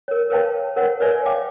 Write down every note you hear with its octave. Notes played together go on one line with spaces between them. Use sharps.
A#4 C#5
A#4 B4 C#5 F5 G5 A5
A#4 C5 C#5 F#5
A#4 B4 C#5 D5 E5 G#5
F5 G5 D6